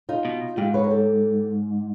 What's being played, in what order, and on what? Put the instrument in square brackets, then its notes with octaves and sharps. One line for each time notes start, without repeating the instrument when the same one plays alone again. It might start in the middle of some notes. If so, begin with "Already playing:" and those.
[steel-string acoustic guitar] D#4 F4
[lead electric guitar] B2
[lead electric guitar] G#2 [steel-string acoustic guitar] F4 G4
[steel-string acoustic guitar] B4 C#5
A#4
G4 A4